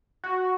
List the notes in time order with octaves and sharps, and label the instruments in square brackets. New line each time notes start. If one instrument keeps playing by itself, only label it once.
[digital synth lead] F#4